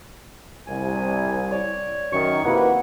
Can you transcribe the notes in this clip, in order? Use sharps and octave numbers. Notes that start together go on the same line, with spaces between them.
C2 G#5
C#5 D5
F#2 D#3 C#6
C3 A#3 D#4 E4 F#4 B4 F#5